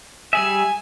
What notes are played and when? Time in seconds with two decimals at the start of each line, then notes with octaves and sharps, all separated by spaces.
0.33 G3 G#4 E5 G#5